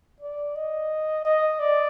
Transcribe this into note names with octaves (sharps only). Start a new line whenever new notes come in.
D5
D#5
D#5
D5